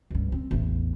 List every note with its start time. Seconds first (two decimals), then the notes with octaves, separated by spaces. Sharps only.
0.10 C#2 G2
0.32 C4
0.51 A1 E2